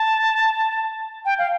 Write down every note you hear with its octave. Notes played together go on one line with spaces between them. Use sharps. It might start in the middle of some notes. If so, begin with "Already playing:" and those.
Already playing: A5
G5
F5